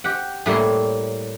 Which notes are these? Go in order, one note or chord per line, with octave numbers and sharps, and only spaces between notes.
G4 F#5
A2 G3 A#3 C#5 C6